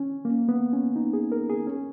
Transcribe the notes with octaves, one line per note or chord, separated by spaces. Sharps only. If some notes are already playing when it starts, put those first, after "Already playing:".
Already playing: C#4
A#3
B3
C#4
D#4
G#4
A#4
G#4
C#4